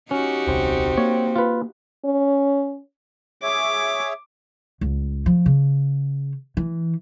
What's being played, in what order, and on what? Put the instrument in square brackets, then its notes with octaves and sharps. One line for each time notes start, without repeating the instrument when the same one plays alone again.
[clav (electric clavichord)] C#4 [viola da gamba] D#4 F#4 G4
[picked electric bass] D#1 C2 [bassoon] C4
[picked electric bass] A#3 [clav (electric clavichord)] C#5
[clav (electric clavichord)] F4 B4
[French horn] C#4
[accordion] G#4 C#5 E5 [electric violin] D6
[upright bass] C#2
F3
C#3
E3